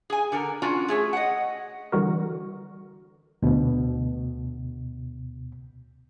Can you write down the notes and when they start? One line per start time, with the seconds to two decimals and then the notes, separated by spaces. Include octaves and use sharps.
0.10 G#4 G#5
0.32 D3 A4 A#4
0.62 C#4 D4 F4 F#4
0.88 A3 G#4 C#5
1.13 D#5 F#5
1.92 D3 E3 G3 F#4 A#4
3.42 D2 B2